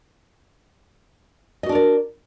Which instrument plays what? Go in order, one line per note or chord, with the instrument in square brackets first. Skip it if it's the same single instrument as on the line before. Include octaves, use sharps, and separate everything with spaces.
[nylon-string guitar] D#5
F#4
D4
A#4
D5